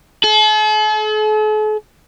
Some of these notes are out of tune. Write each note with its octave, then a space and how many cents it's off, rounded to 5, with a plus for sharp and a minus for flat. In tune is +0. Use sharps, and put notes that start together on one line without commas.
A4 -45